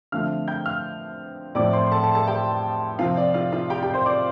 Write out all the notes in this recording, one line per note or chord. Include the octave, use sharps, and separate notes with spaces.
D3 F3 A3 C4 F5 F6
G5 G6
F5 F6
A2 F3 A3 C4 D5 D6
C5 C6
C6
A4 A5
A4 A5
A4 A5
G4 G5
C3 F3 C4 F4 F5
D5
F4 F5
F4 F5
G4 G5
G4 G5
C5 C6
D5 D6